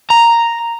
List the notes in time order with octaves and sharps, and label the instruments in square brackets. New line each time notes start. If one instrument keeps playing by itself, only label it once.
[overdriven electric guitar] A#5